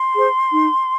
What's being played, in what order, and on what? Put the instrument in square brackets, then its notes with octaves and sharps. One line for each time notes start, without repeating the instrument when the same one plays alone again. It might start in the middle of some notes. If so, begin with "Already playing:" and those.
Already playing: [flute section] C6
G#4 C5
D#4